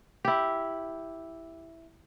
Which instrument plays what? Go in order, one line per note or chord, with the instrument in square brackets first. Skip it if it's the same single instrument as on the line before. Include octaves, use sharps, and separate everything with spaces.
[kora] E4 G4